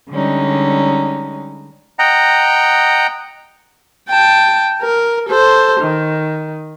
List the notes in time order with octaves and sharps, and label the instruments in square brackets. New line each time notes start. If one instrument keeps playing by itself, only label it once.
[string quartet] D3 G3 G#3 C#4 D#4
[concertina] D#5 F#5 G5 A#5
[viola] G5 A5
A#4
A4 C5
D#3